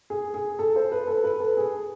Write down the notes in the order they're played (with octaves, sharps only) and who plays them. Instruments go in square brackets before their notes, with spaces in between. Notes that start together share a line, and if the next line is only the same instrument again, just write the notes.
[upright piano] G#4
G#4
A4
C5
B4
A4
B4
A4
G#4